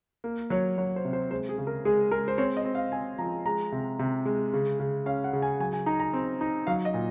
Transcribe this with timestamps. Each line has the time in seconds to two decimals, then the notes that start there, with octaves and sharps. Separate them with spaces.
0.24 A#3
0.50 F#3 C#5
0.78 F#3 C#5
0.96 C5
1.05 C3
1.13 C5
1.31 G#3 C5
1.49 G#4
1.58 C#3
1.67 A#4
1.85 G#3 G#4
2.11 G#3 A#4
2.28 C5
2.38 C4 C#5
2.57 D#5
2.65 C4
2.75 F5
2.92 C4 G#5
3.18 F3 A#5
3.45 G#3 A#5
3.72 C3
3.99 C3
4.26 G#3
4.53 C#3
4.80 C#3
5.06 C#4 F5
5.24 F#5
5.33 C#3
5.42 G#5
5.60 F#3 G#5
5.73 G#5
5.86 D#4 A#5
6.00 A#5
6.13 C4
6.41 D#4
6.67 F#3 F5
6.85 D#5
6.94 A#2